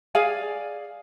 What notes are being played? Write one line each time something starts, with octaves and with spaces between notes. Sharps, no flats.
G#4 D5 F5 G#5